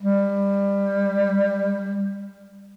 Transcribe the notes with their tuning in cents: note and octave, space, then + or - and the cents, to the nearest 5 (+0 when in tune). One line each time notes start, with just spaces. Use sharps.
G3 +20